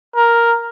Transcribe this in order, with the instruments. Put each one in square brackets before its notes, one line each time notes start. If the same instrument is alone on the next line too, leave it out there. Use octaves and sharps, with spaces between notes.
[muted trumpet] A#4